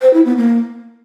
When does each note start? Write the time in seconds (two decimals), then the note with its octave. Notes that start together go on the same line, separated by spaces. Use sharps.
0.02 C5
0.13 E4
0.25 B3
0.37 A#3